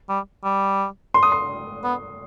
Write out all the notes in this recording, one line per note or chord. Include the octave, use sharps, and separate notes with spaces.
G3
G3
C6
D#6
C6
B3